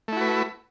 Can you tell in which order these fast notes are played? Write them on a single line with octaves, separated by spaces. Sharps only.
A3 E4 F#4 B4